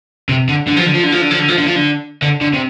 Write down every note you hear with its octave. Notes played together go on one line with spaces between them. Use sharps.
C3
D3
D3
F3
D3
F3
D3
F3
D3
F3
D3
F3
D3
F3
D3
D3
D3
C3